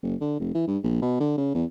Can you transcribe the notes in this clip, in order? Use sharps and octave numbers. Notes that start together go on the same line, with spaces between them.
F#1
D3
F1
E3
G2
A#1
B2
D3
C#3
E2